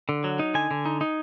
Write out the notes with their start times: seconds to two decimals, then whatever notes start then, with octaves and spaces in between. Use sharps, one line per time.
0.09 D3
0.24 F#3
0.39 D#4
0.54 D3 G#5
0.71 D3
0.86 D#4
1.01 D#4